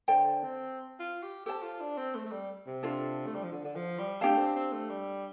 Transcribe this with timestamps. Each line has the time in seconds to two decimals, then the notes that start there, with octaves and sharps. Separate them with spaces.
0.08 D3 A4 C5 G5
0.43 C4
1.00 F4
1.23 G4
1.46 G4 A4 C5 A5
1.62 F4
1.81 D4
1.98 C4
2.15 A3
2.26 A3
2.32 G3
2.67 C3
2.83 D4 F4 A4
3.27 A3
3.35 G3
3.43 F3
3.52 D3
3.65 D3
3.76 F3
3.99 G3
4.21 A3 D4 G4 F5 A5
4.38 C4
4.56 C4
4.72 A3
4.90 G3